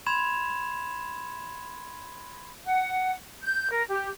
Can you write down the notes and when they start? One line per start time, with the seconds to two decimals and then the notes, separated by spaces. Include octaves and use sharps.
0.06 B5 C6 G#6 E7 F7
2.64 F#5
3.43 G6
3.71 A#4
3.89 G4